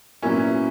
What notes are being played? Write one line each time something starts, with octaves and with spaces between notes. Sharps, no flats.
A#2 F#3 A#3 B3 C#4 E4